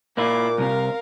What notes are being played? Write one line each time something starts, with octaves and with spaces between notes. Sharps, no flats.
A#2 A#3 E4 F4 D6
C2 C3 A#4 F5